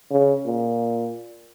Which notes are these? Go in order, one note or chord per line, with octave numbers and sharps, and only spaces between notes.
C#3
A#2